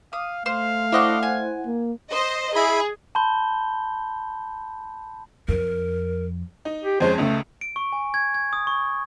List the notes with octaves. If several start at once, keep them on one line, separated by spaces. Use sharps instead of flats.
F5 D#6
A3 C5 F5
D4 E4 C5 D#5 F#5 C#6
G#5
A#3
C5 D#5
E4 G#4 B5
A5 B5 C6 G6 G7
F2 A#4
D#4
G4
F2 G#3 C#4 C5
C#2 C#3 A3
D7
C#6
G#5
G#6
G#6
D#6
C#6